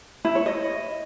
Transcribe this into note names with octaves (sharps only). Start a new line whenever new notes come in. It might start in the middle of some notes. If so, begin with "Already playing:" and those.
E4
C#5
D#5